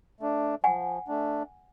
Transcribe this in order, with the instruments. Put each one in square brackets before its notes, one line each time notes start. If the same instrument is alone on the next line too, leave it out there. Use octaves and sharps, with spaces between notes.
[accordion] A3 D4
[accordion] F3 [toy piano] F#5 G#5
[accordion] A3 D4